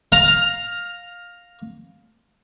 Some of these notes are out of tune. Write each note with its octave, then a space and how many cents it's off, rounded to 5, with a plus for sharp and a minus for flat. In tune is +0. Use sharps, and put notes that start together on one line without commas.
F5 +15 A#5 +0